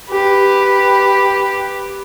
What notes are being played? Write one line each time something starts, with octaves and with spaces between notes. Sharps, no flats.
G4 B4